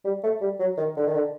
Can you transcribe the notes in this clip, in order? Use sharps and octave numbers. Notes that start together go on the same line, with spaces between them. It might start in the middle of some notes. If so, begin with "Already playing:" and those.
G3
A3
G3
F#3
D#3
D3
D#3
D3